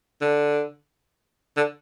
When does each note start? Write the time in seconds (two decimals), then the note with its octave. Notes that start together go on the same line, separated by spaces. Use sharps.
0.21 D3
1.57 D3